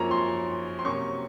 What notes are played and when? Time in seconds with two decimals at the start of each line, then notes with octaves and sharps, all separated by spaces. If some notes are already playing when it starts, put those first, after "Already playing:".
Already playing: F#2 F3 A#3 C#4 C#5 A#5
0.11 C6
0.79 C6
0.85 C3 F#3 A#3 C#4 C#6